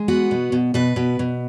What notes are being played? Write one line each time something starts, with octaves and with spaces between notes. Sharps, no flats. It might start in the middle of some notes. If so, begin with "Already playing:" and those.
Already playing: G#3
B3 F#4
B2
B2
B2 B4
B2
B2